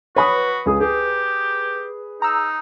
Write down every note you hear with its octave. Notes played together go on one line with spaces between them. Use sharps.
F#4 B4 C#5 B5 D#6
C#2 G#4 D#6
G4 G#4
D#4 A#5 E6